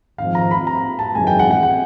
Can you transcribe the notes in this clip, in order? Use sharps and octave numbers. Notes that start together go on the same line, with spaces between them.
G#1 G#2 F3 F5
A#5
B5
A#5
A5
G#1 F#2 C#3 E3 G#3 G#5
G5
F#5
F#5
F#5